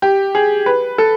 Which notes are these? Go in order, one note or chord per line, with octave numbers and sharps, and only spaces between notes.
G4
G#4
B4
A4